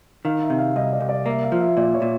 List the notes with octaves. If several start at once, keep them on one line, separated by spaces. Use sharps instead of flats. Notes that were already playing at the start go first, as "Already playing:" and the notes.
D#3 F5
E5
C3
F5
C2 D#5
D5
C2
D5
A#3 E5
F5
F3
E5
A#2 D5
C#5
A#2